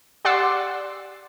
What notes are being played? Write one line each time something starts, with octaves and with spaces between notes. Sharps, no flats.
G4 D5 F#5 C6 D6 E6